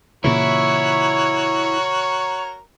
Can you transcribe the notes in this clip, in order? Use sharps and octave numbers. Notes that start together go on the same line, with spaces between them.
A#2 C#3 E3 E4 F#4 A#4 C#5